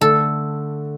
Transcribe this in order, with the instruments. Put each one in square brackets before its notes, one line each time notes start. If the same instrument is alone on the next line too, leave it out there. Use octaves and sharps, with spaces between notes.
[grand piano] D3 A3 D4 [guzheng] A4